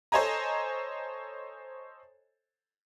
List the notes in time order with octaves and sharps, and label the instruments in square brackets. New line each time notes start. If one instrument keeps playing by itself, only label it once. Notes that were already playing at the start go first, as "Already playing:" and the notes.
[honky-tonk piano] A4 C5 C#5 D#5 G#5 A#5